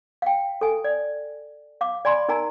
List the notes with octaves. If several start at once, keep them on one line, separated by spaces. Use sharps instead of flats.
F5 G5
A4 G#5
D5
F5 D6
D5 G#5 B5 C6
D#4 A#4 G#5 A#5